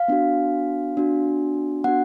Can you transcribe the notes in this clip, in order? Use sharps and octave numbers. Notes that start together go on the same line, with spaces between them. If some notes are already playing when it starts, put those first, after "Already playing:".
Already playing: F5
B3 D4 F#4
B3 D4 F#4
B3 D4 F#4 F#5